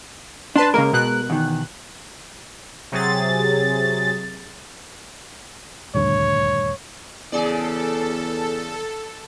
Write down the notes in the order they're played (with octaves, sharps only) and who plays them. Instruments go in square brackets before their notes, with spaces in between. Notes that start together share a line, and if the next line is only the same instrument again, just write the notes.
[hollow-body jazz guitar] D4 [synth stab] B4 A5 C6
[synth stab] C#3 A#3 [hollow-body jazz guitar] G#3 A#4
[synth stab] B2 F#6
[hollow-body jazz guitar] E2 D#3
[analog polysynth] C3 F#3 G#4 A6
[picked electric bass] D#1 D2 G2 [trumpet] C#5
[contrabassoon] E2 [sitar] C#3 G#4 D5 [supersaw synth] A4